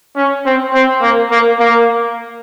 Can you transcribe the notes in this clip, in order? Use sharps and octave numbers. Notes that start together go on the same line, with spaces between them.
C#4
C4
C4
A#3
A#3
A#3